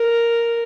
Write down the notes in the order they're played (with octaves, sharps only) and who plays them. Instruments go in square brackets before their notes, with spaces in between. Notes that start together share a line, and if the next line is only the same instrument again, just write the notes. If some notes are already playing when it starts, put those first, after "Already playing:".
Already playing: [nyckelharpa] A#4